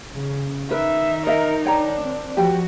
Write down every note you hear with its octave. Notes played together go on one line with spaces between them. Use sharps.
C#3
D#3 D#4 A#4 B4 E5
A#4 D#5 E5
D4 C#5 G5 A#5
C4
F3 F#4 G4 G5